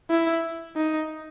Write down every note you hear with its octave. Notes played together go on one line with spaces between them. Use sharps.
E4
D#4